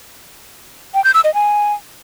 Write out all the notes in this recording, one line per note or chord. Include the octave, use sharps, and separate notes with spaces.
G5
G6
E6
D#5
G#5